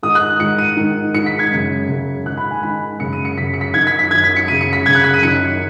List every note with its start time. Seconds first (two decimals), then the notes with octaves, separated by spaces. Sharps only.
0.03 G#2 D#3 D#6
0.15 F#6
0.40 G#2 D#3 C#7
0.58 D#7
0.77 G#2 D#3
1.14 G#2 D#3 C#7
1.26 B6
1.39 G#6
1.51 F#2 C#3
1.89 F#2 C#3
2.26 G#2 D#3 F#6
2.37 B5
2.51 G#5
2.63 G#2 D#3 B5
3.00 F#2 C#3 C#7
3.13 D#7
3.25 C#7
3.37 F#2 C#3 B6
3.54 C#7
3.61 B6
3.74 F#2 D#3 G#6
3.87 B6
3.99 B6
4.11 F#2 D#3 G#6
4.24 B6
4.36 C#7
4.48 F#2 C#3 D#7
4.61 C#7
4.73 B6
4.85 F#2 C#3 G#6
4.95 F#6
5.04 B6
5.14 D#7
5.22 F#2 D#3 C#7